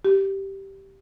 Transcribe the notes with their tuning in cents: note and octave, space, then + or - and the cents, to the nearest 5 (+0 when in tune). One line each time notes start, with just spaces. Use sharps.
G4 -10